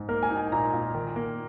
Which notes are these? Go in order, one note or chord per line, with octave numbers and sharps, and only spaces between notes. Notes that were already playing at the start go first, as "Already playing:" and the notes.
Already playing: G#2
A#3 A#4
G#5
D#4
G#5
A#2 A#5
A#2
D#3
A#3